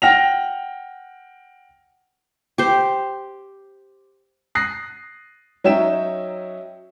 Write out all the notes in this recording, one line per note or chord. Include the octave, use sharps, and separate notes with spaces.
F#5 G5 F6 A#6 F7
G4 C5
D#6 F#6 A#6 C7
F#3 C#4 D#4 E5 G5 E7